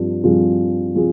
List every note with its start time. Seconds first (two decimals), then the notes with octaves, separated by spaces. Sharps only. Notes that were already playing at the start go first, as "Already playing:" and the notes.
Already playing: G2 F3 C4 F4
0.24 G2 F3 C4 F4 G#4
0.95 F3 C4 F4 G#4